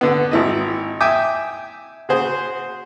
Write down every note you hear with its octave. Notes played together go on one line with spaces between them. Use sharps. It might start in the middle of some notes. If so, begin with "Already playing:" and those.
D3 B3
G#1 E4 D#5
E5 G5 G#5 D6 D#6
C#3 F#4 G#4 C5